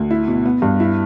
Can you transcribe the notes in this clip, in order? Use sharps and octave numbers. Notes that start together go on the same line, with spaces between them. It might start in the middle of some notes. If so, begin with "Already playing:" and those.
Already playing: D2
E4
B2
B3
G2
E4